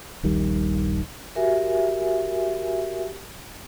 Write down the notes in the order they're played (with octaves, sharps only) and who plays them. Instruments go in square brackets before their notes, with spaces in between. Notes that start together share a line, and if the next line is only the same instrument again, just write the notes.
[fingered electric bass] D#1 A#1 D#3 G3
[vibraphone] F#4 G4 A#4 E5 G#5